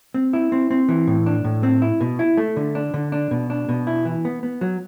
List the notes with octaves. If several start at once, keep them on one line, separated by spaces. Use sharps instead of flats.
C4
E4
C4
C4
E3
A2
D4
A2
C4
E4
B2
E4
A3
D3
D4
D3
D4
B2
D4
B2
E4
E3
B3
B3
F#3